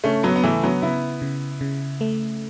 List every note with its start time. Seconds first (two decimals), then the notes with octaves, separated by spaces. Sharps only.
0.04 C#3 A3 C#4
0.23 F#3 B3
0.36 B3
0.44 C#3 E3 A3
0.63 F#3 B3
0.82 C#3 B3 E4
1.22 C#3
1.61 C#3
2.01 A3